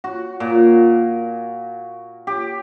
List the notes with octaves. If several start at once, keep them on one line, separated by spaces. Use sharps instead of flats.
F#4
A#2
G4